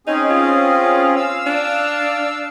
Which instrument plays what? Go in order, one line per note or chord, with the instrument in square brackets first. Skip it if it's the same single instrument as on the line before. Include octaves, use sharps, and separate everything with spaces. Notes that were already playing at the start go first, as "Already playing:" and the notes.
[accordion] C4 C#4 G#4 [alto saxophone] D#4
[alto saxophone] F4
[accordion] F5 E6
[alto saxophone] D4